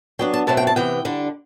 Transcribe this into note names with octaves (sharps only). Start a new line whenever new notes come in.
F#3 B3 D4 G5
A5
B2 F#3 A3 C4 E4 A5
G5
A5
C3 E3 B3 G5
D3 G3 D4